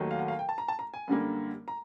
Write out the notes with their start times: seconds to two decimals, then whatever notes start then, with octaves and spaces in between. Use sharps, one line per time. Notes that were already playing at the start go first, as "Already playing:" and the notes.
Already playing: D#2 D#3 F#3 A3
0.11 F5
0.19 F#5
0.28 F5
0.39 G5
0.49 A5
0.58 A#5
0.68 A5
0.79 A#5
0.94 G#5
1.08 F#2 D3 G3 A#3
1.68 A#5